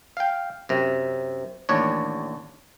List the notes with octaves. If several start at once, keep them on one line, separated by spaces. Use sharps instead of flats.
F5 G5
F#2 C3
A1 D#2 D4 C#5